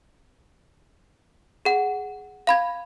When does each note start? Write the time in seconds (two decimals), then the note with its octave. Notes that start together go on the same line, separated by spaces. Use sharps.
1.65 G#4 F#5
2.47 F5 B5 G#6